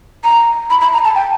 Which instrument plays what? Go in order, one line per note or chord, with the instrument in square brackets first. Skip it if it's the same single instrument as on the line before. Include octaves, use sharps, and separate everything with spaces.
[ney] A#5
B5
B5
A#5
A5
G5